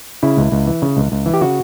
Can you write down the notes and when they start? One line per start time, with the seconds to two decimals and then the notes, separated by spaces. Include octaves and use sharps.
0.23 C#3 E4
0.37 C#2
0.52 C#2
0.67 E3
0.82 C#3
0.97 C#2
1.12 C#2
1.26 E3
1.34 G4
1.41 C#3 F#4